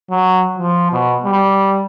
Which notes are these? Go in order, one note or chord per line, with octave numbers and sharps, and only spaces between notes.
F#3
F3
B2
G3